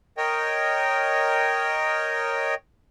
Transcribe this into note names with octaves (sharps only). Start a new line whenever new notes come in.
A#4 C#5 D#5 G5